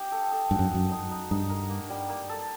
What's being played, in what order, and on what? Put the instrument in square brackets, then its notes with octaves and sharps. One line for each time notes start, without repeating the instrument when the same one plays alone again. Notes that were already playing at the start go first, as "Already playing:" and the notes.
Already playing: [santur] D#4 G4
A4
A4
[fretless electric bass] G2 [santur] F#4
[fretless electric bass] F#2
[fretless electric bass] F#2 [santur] D#4
[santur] D#4
D#4
[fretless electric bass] G2 [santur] D#4
[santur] A#4
A#3
G3
A#3
A4